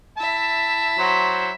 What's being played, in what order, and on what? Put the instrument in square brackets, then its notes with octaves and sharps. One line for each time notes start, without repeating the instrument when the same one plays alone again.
[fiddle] E4 E5 [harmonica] A5
[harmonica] F#3 F#4 C5